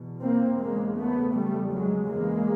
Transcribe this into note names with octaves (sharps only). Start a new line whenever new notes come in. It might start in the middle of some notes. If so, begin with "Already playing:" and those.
Already playing: E2 B2
A#3 C4
E2 C#3 G#3 A#3
A3 B3
E2 C#3 G3 A3
F#3 G#3
E2 C#3 G#3 A#3